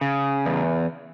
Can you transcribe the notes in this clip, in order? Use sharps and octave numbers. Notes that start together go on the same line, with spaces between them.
C#3
E2